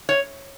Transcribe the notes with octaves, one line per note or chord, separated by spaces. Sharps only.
C#5